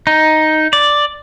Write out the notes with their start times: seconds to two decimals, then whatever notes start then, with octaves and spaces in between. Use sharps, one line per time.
0.07 D#4
0.73 D5